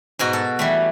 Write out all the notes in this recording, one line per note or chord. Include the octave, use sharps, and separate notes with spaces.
G#2 B2 F#4
A4
E3 G3 A3